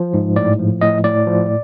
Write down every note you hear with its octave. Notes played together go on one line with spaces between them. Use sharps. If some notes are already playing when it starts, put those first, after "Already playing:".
Already playing: F3
G#2
A2 D5
F3
A2 D#5
A2 D5
F3